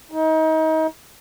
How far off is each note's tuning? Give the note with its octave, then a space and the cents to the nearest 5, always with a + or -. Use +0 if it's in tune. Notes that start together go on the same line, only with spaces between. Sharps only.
D#4 +30